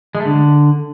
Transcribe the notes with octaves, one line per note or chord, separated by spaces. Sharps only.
G#3
A3
D3